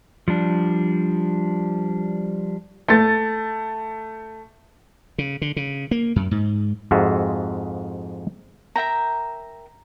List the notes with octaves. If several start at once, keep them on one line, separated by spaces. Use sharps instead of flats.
F3 G3 D4
A3 A6
C#3
D3
C#3
A#3
F#2
G#2
F2 G#2 F4 F#4 G#4 E5
A#4 E5 G5 A#5